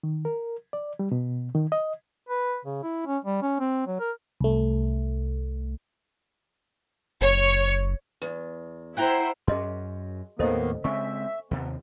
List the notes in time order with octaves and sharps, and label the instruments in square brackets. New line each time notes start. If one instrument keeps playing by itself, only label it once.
[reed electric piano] D#3
A#4
D5
G3
B2
D#3
D#5
[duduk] B4
C#3
E4
C#4
G3
C#4
C4
F#3
A#4
[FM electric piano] C2 A3
[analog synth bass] F#1 [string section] C#5
[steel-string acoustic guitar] E2
[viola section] E4 C5 [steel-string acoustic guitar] F#5 G5 A#5
[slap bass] F#2 C#4 [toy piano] G#4 D#5 C6
[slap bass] D#2 A2 [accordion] D#3 A#3 B3 [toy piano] A4 C5 D#5
[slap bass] C#3 G#3 C4 [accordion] E5 [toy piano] G#5 C#6
[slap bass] D#2 C3 [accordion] B3